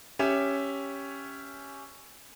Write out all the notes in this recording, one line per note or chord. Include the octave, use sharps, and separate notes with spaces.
C#4 G4 C#5 E5